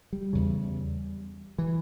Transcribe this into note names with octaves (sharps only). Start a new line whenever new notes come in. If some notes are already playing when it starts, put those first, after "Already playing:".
G3
E2 C#3
E3